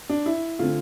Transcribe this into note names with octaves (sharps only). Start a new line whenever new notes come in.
D4
E4
D3 A3 C4 F4